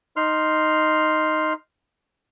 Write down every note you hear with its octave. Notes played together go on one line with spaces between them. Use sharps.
D#4 C6 F6